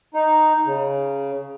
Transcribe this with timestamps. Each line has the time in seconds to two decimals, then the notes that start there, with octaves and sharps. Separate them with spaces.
0.14 D#4
0.66 C#3